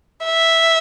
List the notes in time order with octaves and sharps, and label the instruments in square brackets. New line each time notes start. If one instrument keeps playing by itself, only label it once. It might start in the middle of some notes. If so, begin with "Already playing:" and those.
[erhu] E5